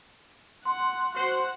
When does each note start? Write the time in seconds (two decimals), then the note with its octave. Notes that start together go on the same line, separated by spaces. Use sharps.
0.65 F#5 C6
1.15 F#4 C5 F#5